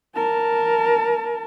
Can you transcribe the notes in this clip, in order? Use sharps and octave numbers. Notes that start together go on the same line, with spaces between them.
A#4 A5